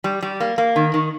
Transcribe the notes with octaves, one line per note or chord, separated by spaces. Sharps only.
G3
G3
A#3
A#3
D#3
D#3